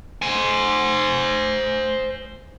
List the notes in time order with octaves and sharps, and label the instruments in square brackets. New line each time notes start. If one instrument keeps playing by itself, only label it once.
[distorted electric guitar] C5 G#5